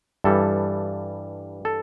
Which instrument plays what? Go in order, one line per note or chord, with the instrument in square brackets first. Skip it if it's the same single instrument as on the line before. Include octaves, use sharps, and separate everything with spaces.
[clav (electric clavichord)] G2 E3 G3 A4
A4